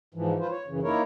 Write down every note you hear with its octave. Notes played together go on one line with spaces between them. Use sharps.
G#2 E3 F3
F4 B4 C5
C#5
F#2 C#3 E3
A#3 D#4 E4 A#4 C#5